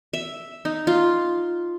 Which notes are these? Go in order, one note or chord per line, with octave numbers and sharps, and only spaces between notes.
E5
D#4
F4